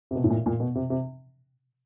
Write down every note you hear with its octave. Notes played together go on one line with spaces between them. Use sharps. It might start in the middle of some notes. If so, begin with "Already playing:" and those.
C3
B2
A2
A#2
A#2
B2
C3
C3